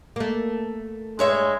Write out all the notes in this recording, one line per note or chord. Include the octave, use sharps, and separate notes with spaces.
A3 A#3
G2 G#3 C#5 E5